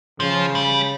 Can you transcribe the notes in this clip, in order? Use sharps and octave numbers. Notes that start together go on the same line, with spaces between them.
C#3 F3
G3